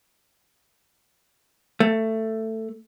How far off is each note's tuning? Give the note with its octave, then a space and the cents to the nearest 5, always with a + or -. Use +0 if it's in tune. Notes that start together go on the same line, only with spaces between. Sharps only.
A3 +15